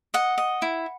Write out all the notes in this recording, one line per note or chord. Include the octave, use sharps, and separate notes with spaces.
D#5 F#5
D#5
E4